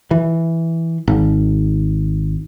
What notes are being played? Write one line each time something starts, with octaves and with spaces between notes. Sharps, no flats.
E3
G#1